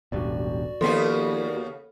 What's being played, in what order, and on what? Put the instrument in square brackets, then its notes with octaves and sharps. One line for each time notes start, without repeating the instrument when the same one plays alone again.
[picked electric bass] E1 A1 G2 [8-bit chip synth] F#4 D5
[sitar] D#2 C#3 B3 [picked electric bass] F3 A#3 [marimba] A4 C6